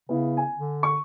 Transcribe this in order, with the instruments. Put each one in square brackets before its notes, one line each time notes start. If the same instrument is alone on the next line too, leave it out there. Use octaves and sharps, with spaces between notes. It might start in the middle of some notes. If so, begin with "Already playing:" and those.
[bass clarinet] C#3 [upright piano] B3 E4
[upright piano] G#5
[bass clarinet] D3
[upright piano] C#6